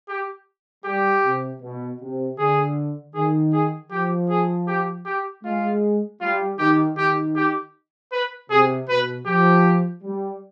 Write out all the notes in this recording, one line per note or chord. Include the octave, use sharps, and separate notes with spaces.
G4
G3 G4
C3
B2
C3
D3 G#4
D#3 G#4
G#4
F3 G4
G#4
G4
G4
G#3 F4
G3 F4
D#3 G4
D#3 G4
G4
B4
C3 G#4
B2 B4
F3 G4
G3